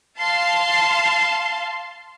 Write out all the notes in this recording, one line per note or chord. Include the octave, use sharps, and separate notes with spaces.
F5 A5 C6